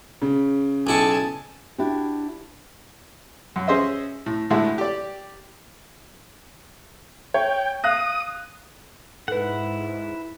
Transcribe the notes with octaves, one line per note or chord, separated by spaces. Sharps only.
C#3
B1 E4 G#5 A5 C#6
D4 E4 F#4 G4
F#2
C#4 G#4 C5 D#5 E5
A2
A2 D3 G#3 E4 F#4 G#4
G4 D5
C#5 G5
F5 D#6 F#6 A#6
G#2 E4 A4 B4 F#5